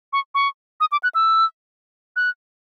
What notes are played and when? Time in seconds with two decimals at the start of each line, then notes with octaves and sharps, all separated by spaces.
0.13 C#6
0.35 C#6
0.80 D#6
0.92 D6
1.03 F#6
1.15 E6
2.16 F#6